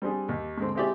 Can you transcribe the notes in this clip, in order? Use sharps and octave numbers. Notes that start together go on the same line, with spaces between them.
G3 C4 D4 G#4
D#2
G#2 D3 C4
G#3 C4 E4 G4 G#4 D5